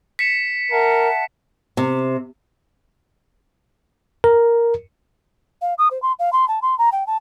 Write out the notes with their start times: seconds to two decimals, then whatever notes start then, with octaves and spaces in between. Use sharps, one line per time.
0.19 B6 C#7 E7
0.72 A#4 E5 F#5 A5
1.77 C3
4.24 A#4
5.62 F5
5.78 D#6
5.91 C5
6.02 C6
6.19 F5
6.33 C6
6.48 A5
6.62 C6
6.78 A#5
6.92 G5
7.07 A5